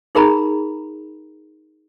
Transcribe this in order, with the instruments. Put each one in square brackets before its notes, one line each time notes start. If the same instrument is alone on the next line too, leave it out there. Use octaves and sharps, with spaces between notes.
[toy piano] D#4 G#4 A#4 A#5 B5